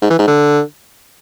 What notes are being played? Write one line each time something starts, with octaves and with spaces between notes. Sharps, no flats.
G#2
E3
G#2
D3